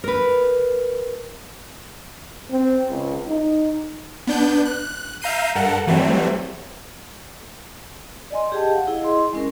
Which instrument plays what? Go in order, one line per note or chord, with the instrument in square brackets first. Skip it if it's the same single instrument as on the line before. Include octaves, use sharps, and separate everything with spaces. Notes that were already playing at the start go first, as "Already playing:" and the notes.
[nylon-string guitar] A#4 B4
[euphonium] C4
C#2
D#4
[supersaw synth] B3 D4 G6
F#6
E5 F5 A#5 G6 C7 D#7
G2 A4 A#4 F#5
E3 F#3 G3 A3 C4
[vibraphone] D5 D#5 G#5 C6
G4 G#4 D#5 G5 A5
F5 F#5
E4 G#4 D#5
E4 G#4 D#5 C6
G#3 C#4 A#4